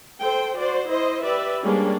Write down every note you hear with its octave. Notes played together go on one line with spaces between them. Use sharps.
A4 C5 G5
F#4 C5 D5
E4 C5 D#5
G4 B4 D5 E5
G3 G#3 A#3 C#4 D4